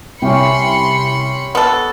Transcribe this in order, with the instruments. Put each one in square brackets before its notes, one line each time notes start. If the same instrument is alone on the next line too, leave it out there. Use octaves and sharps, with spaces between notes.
[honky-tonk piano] C2 [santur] C#4 G4 G5 [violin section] B5 C6 C#7
[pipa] B3 A4